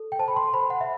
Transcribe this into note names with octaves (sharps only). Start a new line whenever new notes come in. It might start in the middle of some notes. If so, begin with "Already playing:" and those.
Already playing: A4
G5
C5 A5
B5
C6
C5 B5
F#5
E5